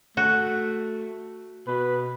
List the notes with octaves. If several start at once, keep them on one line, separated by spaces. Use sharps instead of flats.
A3 F#4
B2 B4